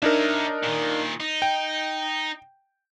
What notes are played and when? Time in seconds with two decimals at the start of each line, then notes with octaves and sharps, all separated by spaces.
0.02 D4 D#4 A#4 C#5 E5
0.63 A#2 D#3
1.20 D#4
1.42 G5